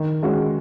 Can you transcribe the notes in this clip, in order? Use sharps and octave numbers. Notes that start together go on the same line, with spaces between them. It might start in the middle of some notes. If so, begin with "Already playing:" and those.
Already playing: D#3
G#3 C#4 F#4